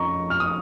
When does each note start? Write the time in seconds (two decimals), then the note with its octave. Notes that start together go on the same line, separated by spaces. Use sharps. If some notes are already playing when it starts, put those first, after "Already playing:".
Already playing: F2 F3 C#4 D#5 A#5 C#6
0.30 F6
0.40 D#6